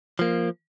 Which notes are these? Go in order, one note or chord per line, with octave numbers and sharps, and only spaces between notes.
F3 A#3